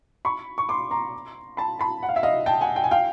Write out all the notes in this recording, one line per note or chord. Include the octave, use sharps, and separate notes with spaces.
B5 C#6
C#6
C6 D6
A#5 C6
A5 B5
A5 B5
F#5
F5
E5
D#5 F5
G5 A5
F#5 G#5
G5
G#5
F5 G5